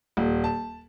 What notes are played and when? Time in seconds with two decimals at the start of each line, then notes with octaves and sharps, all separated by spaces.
0.17 D#1
0.44 A5